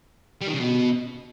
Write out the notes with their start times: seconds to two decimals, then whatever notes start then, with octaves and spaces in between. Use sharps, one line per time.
0.41 G3
0.48 D#3
0.54 C#3
0.60 B2